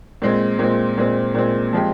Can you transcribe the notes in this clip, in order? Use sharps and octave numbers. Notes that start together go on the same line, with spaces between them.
A#2 G#3 C4
A#2 G#3 C4
A#2 G#3 C4
A#2 G#3 C4
F3 G#3 C4 G4